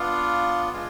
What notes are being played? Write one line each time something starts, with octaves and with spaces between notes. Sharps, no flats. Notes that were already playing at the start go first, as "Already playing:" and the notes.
Already playing: B3 D4 F4 F5
G#3 D4 F4 F5